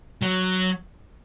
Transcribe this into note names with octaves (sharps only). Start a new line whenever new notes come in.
F#3